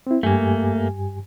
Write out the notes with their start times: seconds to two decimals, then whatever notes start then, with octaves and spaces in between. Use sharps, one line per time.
0.07 C4 E4
0.23 G2 A3 A#3 G4 G#5